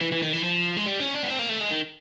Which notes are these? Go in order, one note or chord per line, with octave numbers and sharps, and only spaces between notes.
E3
E3
D#3
E3
F3
G#3
G3
C#4
D4
B3
C4
A#3
A3
G#3
D#3